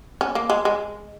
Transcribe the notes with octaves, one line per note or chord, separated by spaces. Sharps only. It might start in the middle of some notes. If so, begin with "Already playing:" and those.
C#4
A#3
G#3
G#3